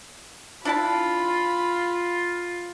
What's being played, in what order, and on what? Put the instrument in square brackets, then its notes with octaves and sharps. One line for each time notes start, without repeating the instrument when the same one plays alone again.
[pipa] D4 E4 A5 [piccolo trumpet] F4 [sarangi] B5